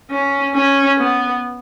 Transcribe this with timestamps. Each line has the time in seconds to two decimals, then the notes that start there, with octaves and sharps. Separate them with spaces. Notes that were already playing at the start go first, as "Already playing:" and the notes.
0.11 C#4
0.55 C#4
0.99 B3